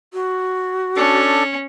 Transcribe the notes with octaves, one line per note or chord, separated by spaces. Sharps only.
F#4
C#4 D4 A4